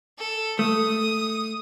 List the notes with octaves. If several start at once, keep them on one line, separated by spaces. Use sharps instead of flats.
A4
A3 D#6